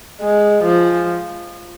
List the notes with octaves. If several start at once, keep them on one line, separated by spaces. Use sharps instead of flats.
G#3
F3